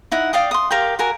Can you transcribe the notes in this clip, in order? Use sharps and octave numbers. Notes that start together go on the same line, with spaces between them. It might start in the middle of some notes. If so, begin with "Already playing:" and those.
D#4 E4 F#5
D5 F5 G5 D#6
C6 D#6
G4 A#4 F5 G5
F#4 A#4 G#5